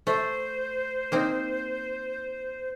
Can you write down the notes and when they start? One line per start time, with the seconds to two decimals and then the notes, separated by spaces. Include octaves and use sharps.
0.07 A3 C5
1.12 A#3 C4 D#4